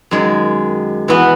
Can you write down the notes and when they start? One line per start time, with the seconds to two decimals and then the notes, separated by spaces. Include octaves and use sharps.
0.11 F#2 D#3 G#3
1.08 E3 B3 F#4